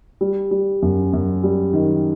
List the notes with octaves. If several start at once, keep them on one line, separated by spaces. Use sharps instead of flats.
G3
G3
F#2
F#2
G3
D#3